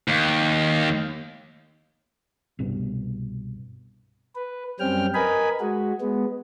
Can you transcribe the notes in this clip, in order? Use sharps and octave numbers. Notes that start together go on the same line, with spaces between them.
D#2
C2 G2 B2
B4
F#2 G3 C4 C#4 G5 F6
A#4 B4 D#5 G#5 B5
G#3 F#4
G#3 B3